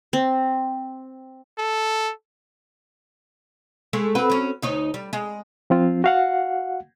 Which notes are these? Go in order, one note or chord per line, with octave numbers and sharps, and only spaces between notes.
C4
A4
G#3 A3
C4 F#4 B4
F#3 C#4
D2 D#4 C#5
G3
G#3
F3 C4 F4
F#4 F5 F#5